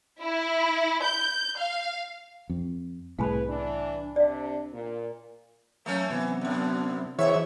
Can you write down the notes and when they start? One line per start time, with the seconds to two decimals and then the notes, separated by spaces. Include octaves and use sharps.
0.20 E4
1.03 G6
1.57 F5
2.49 F2
3.19 C2 A2 G#4 B4 F5 G#5 B5
3.48 E3 D4
4.16 C3 D4 D5 F5
4.73 A#2
5.86 F#3 A3 A#3 C#4
6.10 C3 E3 F#3 B3 C4
6.41 F#2 D3
7.19 B2 E3 G#4 C5 C#5 E5 F#5